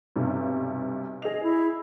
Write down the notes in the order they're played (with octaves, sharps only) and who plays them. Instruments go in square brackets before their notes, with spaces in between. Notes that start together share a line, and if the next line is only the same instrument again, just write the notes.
[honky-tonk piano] B1 G2 C3
[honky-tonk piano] G#4 F7 [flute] D#5
[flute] E4